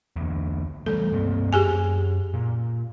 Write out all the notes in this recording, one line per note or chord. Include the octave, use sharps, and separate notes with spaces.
E2 D3
E3 G3 A3 A4
G2 A#3 C4
F#2 G4 G#4 G#5
A#2